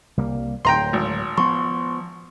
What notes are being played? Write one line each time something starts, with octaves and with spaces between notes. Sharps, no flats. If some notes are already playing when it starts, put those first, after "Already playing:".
C2 G3 A#3
D1 G5 A#5 C6
G#1
F3 B3 C6 C#6